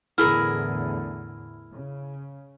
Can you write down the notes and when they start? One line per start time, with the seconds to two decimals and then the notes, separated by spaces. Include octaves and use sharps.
0.18 E2 A2 D3 E4 G#4 A#4 F6
1.72 C#3